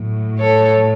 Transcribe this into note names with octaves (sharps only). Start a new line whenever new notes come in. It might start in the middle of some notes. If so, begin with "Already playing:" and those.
Already playing: A2 F#3
A4 C#5